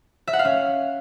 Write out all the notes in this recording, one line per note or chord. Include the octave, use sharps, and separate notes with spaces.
E5
F#5
F5
C#4